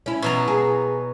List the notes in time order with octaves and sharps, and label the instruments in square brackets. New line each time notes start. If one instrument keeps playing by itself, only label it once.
[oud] C#4 E4
[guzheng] B2 F#3 A#5
[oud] G#4